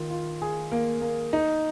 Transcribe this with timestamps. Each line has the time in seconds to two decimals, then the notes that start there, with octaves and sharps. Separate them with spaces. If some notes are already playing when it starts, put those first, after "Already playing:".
Already playing: D#3 F4
0.10 F4
0.42 G#4
0.72 A#3
1.01 A#3
1.33 D#4